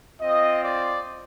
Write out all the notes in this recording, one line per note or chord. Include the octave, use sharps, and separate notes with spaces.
C4 F4 D#5
D5